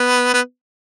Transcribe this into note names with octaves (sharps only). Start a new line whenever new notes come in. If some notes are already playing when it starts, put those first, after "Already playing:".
Already playing: B3
B3